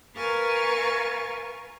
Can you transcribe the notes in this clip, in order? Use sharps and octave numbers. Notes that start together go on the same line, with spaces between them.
A#4 B4 F5 G#5 C#6 A6